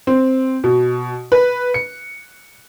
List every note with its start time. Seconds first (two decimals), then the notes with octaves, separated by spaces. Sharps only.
0.07 C4
0.64 B2
1.32 B4
1.74 C#7